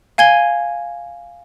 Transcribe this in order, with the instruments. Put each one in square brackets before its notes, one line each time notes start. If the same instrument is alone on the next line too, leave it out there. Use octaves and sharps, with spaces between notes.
[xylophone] F5 G#5 G#6 D#7 G7